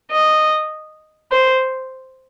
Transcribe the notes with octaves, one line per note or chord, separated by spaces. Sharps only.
D#5
C5